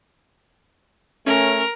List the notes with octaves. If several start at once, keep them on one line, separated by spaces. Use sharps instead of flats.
A3 C#4 A#4